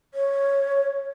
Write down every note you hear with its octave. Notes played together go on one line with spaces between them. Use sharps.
C#5